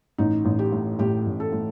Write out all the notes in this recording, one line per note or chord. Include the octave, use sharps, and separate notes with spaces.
A1 D#4
A1
G4
A2
A2 G4
A1
A4
A2